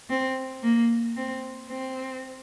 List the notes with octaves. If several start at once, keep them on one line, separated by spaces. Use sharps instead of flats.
C4
A#3
C4
C4